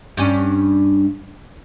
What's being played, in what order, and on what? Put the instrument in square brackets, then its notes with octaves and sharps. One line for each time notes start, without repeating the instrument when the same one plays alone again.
[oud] G2 C#4